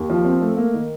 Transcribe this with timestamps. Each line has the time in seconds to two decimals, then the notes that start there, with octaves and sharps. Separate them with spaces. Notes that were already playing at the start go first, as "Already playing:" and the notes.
Already playing: D#2
0.10 F3
0.25 C4
0.41 A3
0.57 A#3
0.73 D#3